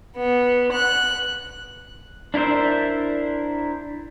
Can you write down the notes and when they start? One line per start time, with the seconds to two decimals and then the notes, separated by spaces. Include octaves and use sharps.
0.18 B3
0.73 F#6
2.34 D4 E4 A#4 C5 E5